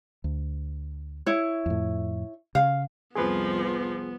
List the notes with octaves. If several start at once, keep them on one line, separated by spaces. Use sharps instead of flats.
D2
E4 C#5
F2 A2
C#3 F5
C2 F2 F3 B3 G#4 B4